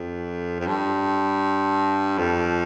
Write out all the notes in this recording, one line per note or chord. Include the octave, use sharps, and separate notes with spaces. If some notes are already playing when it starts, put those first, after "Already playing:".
Already playing: F2
F2
G2
F2